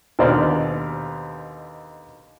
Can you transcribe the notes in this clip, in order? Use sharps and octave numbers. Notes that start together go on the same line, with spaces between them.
D#2 B2 D3 C5 D5 F6